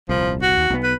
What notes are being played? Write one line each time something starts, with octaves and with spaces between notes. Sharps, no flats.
D#1 C2 F3
F#4
D#2
B1 B3
B4